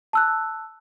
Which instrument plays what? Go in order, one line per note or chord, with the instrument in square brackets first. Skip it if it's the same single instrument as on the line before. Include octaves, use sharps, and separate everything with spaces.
[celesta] A5 E6 F#6